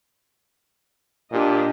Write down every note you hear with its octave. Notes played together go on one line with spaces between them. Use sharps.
A#2 D4 G4 D#5